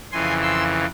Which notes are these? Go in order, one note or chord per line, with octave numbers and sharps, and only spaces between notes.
F2 C#3 E3 G#5 C6
C6 E6